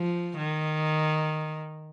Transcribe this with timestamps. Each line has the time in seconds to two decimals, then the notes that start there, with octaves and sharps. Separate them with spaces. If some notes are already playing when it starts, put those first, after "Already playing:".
Already playing: F3
0.37 D#3